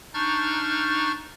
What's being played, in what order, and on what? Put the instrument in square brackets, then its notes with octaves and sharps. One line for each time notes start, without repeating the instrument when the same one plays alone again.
[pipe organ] D4 D#4 C#6 F6 G6 A6